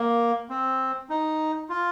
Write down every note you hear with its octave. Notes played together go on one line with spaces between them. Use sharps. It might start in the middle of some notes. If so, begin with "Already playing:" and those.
Already playing: A#3
C4
D#4
F4